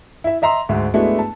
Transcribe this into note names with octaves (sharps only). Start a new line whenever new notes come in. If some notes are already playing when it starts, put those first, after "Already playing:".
E4 E5
D#5 E5 A#5 C6
D2 G#2 E5
G#3 A3 B3 D4 E4 F#4
A5